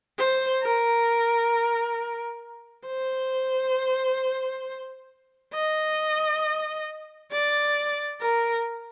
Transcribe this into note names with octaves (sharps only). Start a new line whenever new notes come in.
C5
A#4
C5
D#5
D5
A#4